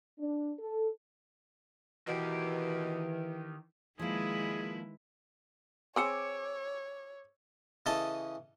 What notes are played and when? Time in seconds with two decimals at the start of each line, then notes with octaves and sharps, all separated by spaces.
0.19 D4
0.59 A4
2.08 B2 D#3 E3 G4
3.99 D#3 F3 G#3 A#3 E4 G#4 B4
5.96 C4 G#4 C#5 D6 E6 C#7
7.86 C#3 E3 A4 D#5 A5